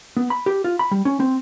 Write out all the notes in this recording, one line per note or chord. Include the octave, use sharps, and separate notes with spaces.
B3
B5
G4
F4
B5
G3
C#4
C4